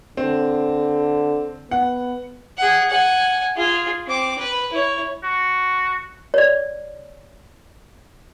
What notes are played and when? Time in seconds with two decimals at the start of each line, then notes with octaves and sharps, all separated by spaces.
0.17 D3 C4
1.71 B3 F#5
2.57 G#4 F#5
2.90 F#5 G#5
3.56 F4 G#4
4.07 C4 D6
4.39 B4
4.72 E4 C#5
5.23 F#4
6.34 C#5 D5